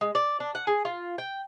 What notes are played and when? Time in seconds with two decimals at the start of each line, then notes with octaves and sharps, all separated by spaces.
0.01 G#3
0.15 D5
0.40 D4
0.55 F#5
0.67 G#4
0.85 F4
1.18 G5